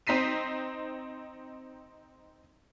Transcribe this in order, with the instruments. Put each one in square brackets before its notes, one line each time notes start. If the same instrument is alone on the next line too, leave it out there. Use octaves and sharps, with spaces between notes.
[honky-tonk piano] C4 D#4 B6 C7 D#7